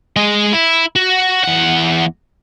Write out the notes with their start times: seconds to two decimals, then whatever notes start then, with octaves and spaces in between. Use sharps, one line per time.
0.16 G#3 D#5
0.53 E4
0.96 F#4
1.44 E2 F#5